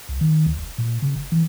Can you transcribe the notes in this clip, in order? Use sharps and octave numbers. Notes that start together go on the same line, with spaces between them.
C2
D#3
D2
F1
A#2
C#3
F#1
E3